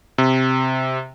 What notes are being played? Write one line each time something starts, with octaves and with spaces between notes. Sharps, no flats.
C3